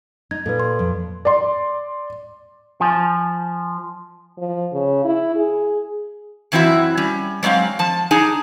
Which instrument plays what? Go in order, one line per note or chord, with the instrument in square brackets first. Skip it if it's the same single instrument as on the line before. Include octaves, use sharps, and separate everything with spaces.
[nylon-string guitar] D#4 [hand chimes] G#6
[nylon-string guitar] A#2 [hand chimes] A4 B4
[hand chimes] C6
[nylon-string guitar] F2
[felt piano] D5 C6
[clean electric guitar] F3 [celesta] G#5
[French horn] F3
C#3
E4
G#4
[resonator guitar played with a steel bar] F#2 E3 C4 E4 F#4 E5
G3 C#4
F#3 G#3 A#3 C4 F5
F3 A5
D4 D#4 G#4 G#5 A#5